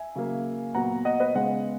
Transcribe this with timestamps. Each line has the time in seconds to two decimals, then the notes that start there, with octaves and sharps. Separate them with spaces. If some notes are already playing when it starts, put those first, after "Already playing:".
Already playing: E5 G#5
0.15 C#3 F#3 A#3
0.74 A#2 F#3 B3 F#5 A#5
1.05 D#5 F#5
1.20 B4 D#5
1.35 C#3 G#3 B3 D#5 F#5